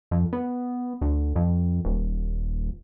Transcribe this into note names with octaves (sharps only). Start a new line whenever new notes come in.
F2
B3
D2
F2
D#1